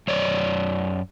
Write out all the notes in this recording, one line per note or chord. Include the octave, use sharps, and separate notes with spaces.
F#2 C#5 D5